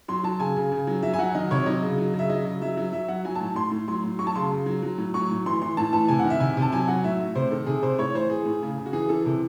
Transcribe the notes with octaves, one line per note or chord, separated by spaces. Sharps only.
F#3 C6
F#3 A5
C#3 G#5
C#3
C#3
F#3
F#3 E5
G#5
F#3 F#5
D#3 D#5
C3 C#5
F#3 D#5
C#3
F#3
C#3
E5
F#3 D#5
C#3
F#3 E5
F#3
F#3 E5
F#3 F#5
F#3 G#5
A5
A2
A2 C6
A2
F#3 C6
A2
F#3 C#6
A5
C#3 C6
C#3
F#3
F#3
A2
F#3 C#6
A2
E3 C6
E3 C6
A2 A5
E3 A5
C3 G#5
F#5
D#3
E5
C3 G#5
C3
A5
F#3 G#5
F#3 F#5
A2 E5
A2
C3 C5
D#3 A4
C3 G#4
C3 C5
A2 C#5
E3 C5
E3 G#4
A2
C#3
C#3
F#4
E3 G#4
E3 A4
C3